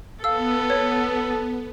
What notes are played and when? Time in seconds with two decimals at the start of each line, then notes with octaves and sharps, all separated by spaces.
0.24 B3 A4 F5 E6
0.70 C#5